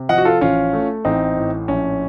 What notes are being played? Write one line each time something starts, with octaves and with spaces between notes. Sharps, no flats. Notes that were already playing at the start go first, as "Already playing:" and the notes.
Already playing: C3
F3 D#5 F#5
F#4
F4 A4
A1 C#4 F4
A3
A1 C4 D#4
A2
A#1 C#4